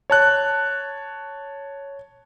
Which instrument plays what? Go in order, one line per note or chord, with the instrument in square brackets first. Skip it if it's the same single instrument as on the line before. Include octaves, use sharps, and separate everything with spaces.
[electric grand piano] C#5 A5 F#6